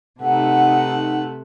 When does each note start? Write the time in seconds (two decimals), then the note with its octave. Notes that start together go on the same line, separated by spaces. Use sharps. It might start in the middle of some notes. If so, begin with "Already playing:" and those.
0.19 C3 A3 D#4 B4 F#5